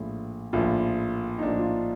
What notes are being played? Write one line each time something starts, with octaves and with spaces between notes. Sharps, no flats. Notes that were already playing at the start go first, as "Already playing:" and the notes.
Already playing: A#1 A2 F3
A#1 A2 F3 F4
D#4
A#1 A2 F3 D4
F4
D#4